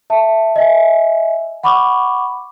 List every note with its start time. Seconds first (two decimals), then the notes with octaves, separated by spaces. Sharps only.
0.10 E5 A5
0.56 D#5 E5 G#5
1.63 F#5 B5 C#6 D6